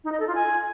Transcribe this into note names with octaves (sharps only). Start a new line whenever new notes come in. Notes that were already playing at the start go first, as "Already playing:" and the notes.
D#4
D#5
A4
F4
G#5